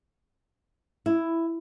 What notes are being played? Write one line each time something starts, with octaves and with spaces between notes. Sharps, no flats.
E4